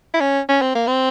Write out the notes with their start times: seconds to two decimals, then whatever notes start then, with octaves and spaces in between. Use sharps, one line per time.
0.14 E4
0.20 C#4
0.49 C#4
0.61 C4
0.75 A#3
0.87 C4